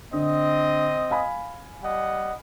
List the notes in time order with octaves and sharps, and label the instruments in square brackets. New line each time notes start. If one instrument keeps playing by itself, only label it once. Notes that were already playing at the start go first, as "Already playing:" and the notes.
[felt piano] D3 [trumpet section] C4 D#5
[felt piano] F5 G#5 B5
[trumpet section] G3 D#5 F#5